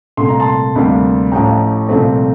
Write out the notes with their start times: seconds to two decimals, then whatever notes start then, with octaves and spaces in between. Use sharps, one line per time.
0.17 C2 A#2 A3 C6
0.29 A#5
0.39 A5 C6
0.75 D2 C3 G3 A#3
1.32 A1 A2 F3 G5 A#5
1.89 C2 A#2 F3 A3 C4